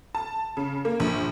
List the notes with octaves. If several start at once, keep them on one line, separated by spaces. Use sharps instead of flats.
A5
C#3
A#3
A#1